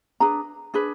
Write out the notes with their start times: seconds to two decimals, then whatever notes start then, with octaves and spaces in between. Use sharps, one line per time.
0.20 D4 G#4 B4 A#5
0.74 D4 G#4 B4